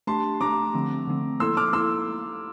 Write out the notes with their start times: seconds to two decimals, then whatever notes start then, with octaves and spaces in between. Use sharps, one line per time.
0.07 A3 D4 G4 A5 C6
0.41 A3 D4 G4 A#5 D6
0.74 D3 F3 A3 C4
1.07 D3 F3 A3 C4
1.40 A#3 E4 A4 C6 E6
1.57 D6 F6
1.73 A#3 E4 A4 C6 E6